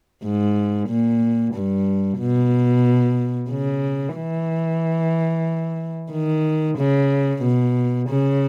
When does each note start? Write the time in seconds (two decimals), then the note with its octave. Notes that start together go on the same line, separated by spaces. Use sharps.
0.23 G#2
0.89 A#2
1.54 G2
2.20 B2
3.50 C#3
4.16 E3
6.12 D#3
6.78 C#3
7.43 B2
8.09 C#3